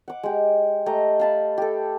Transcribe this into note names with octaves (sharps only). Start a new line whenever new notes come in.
F#5 D6
G#3 G4
A3 G4 D#5 A#5
F5 A5 B5
G4 A4